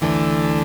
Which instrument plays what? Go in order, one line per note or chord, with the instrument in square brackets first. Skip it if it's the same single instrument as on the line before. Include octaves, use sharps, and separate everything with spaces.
[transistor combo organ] D2 D3 A3 [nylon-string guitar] E3